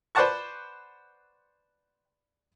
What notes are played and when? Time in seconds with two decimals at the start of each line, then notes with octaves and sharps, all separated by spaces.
0.15 B4 C5 D5 F#5 A5 C#6